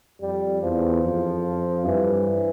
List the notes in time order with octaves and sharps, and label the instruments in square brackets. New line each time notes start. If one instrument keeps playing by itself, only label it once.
[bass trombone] F2 [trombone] G3
[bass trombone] E2 [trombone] F3
[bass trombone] F2
[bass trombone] G2 [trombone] E3